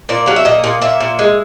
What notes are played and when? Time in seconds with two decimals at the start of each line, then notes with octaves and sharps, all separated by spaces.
0.09 A#2 D5
0.26 F#3 F5
0.36 E5
0.45 A#2 D#5
0.64 A#2
0.82 A#2 E5
1.00 A#2
1.19 G#3